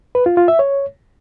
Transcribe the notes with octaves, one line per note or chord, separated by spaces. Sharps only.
B4
F4
F4
E5
C#5